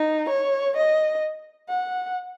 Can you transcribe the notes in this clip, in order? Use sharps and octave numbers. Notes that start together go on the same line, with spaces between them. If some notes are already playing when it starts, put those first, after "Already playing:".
Already playing: D#4
C#5
D#5
F#5